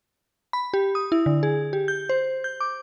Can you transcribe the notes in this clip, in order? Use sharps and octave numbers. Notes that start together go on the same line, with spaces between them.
B5
G4
D#6
E4
D3
G#4
G4
G6
C5
G6
D6